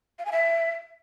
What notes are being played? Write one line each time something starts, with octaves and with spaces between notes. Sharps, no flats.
F5
G#5
E5